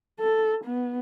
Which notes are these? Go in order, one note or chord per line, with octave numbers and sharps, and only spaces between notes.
A4
B3